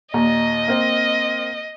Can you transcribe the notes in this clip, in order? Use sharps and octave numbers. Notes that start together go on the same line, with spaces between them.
D#2 A#2 D#5 A#5
A#3 C4